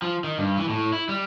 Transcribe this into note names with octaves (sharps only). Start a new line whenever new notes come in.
F3
D#3
G2
E3
A2
E4
G3